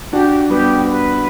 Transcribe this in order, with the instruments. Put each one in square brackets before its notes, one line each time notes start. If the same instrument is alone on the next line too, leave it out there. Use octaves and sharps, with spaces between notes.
[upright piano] D4 F#4 [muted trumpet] G4
[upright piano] G3 B3 [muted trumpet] G4
[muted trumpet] B4